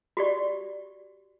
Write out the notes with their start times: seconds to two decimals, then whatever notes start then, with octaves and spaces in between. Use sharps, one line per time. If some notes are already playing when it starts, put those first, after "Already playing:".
0.17 F#4 G4 D5